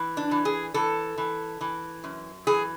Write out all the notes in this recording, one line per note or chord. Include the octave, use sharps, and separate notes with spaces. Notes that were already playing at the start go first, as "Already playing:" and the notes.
Already playing: E3
D4
E3
G#4
E3 A4
E3
E3
F#2
E3 G#4